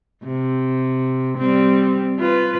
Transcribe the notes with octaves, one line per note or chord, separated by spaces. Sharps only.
C3
G3 C4
F4 B4